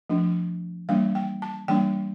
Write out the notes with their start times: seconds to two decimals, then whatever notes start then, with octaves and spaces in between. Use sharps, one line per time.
0.10 F3 A3 D4
0.89 E3 G3 A#3 D4 F5
1.15 G5
1.42 A5
1.68 E3 G3 A#3 D4 G5